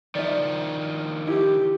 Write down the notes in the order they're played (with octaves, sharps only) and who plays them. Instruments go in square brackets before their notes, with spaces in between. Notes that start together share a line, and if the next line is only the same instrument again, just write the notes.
[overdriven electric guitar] D#3 F3 [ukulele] D5 E5
[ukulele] E4 [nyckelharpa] G4